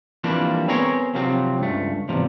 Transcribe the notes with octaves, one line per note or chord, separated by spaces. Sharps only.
E3 F3 G3 A#3 C4 D4
B3 C4 G#4 A#4 C#5
C3 F3 F#3 C4
C#2 G2 A3
E2 G#2 C3 F3